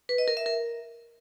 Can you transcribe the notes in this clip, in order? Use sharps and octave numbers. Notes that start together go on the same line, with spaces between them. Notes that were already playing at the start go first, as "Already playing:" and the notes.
B4
D#5
A#4
E5
A#4